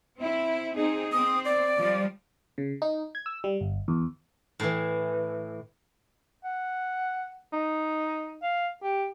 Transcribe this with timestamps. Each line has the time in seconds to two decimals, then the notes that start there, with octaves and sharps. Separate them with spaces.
0.19 C4 E4
0.75 C4 D#4 G#4
1.12 C4 D#6
1.45 D5
1.76 F3 G3
2.58 C#3
2.82 D#4
3.15 G#6
3.26 E6
3.44 G3
3.61 G1
3.88 E2
4.60 A2 E3
6.44 F#5
7.53 D#4
8.43 F5
8.83 G4